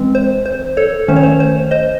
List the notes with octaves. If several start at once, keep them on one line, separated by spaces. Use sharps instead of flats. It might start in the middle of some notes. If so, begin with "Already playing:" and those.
Already playing: E3 G#3 C4
C5
C5
A4 C#5
D#3 A3 C#4 C5
C#5
C5
C5
C5 D#5